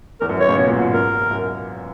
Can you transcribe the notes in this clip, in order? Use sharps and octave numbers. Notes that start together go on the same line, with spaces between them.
E2 A#4
F#2
D#3 C#5
C#3
B2
A#2
G#2
F#2
A#4
F#2